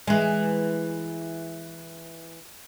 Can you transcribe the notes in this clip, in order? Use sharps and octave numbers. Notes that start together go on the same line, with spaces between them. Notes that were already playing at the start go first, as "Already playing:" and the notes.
E3 G#3